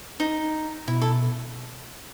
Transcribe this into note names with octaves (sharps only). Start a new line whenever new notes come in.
D#4
B2 E4
A4